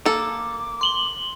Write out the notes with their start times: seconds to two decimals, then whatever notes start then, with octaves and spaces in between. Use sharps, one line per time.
0.06 A#3 A4 D6
0.81 C6 F#7 G7